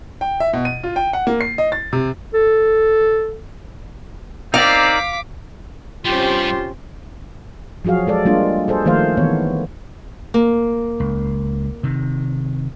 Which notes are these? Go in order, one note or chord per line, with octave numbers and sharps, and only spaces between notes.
G5
E5
B2
D#7
F4
G5
F#5
A#3
C7
D#5
A6
C3
A4
C4 D#4 A#4 D5 F5 D6 B6
G2 C3 G3 C#4 F4 G4 C5
F3 F#3 F#4 G#4 F5
G#3 A4 D5
G3 G#3 A#3 D4 F4
G#4 A4 C5
D#3 F3 A3 A#3 C5 F5
D#3 E3 B3 C#5
A#3
C#2
C3 D#3